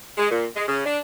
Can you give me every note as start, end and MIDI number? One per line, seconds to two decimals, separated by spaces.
0.17 0.30 56
0.31 0.46 46
0.55 0.63 56
0.68 0.82 49
0.85 0.98 62